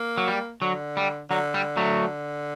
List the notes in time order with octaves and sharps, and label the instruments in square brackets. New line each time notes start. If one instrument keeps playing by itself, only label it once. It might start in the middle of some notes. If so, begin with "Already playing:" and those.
Already playing: [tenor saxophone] A#3
[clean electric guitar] F#3
G3
[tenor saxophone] D3 [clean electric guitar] F#3
[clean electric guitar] G3
[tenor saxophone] D3 [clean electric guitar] F#3
[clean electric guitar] G3
F#3 A3